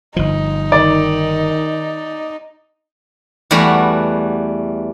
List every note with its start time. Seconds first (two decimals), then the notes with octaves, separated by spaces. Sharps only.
0.16 G1 F3 D#4
0.72 D#3 D5
3.51 E2 G3 A3 F#4 B5